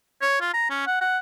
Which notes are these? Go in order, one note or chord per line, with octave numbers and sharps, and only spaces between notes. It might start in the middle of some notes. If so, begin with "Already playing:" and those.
C#5
F4
A#5
C#4
F#5
F#5